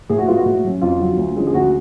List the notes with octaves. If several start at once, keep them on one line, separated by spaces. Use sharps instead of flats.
A2 G#4
F#4
G#3 B3 F4
F#4
A2
F#3 C#4
F2 F4
D3 F#3
D2
D3 F3 G#3 C#4
G#4
D2 F#4